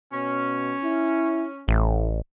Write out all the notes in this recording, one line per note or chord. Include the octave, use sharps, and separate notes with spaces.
B2 C#4
E4
A1 A2